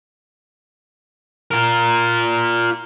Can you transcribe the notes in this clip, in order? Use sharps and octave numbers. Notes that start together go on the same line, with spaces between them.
F4 A#4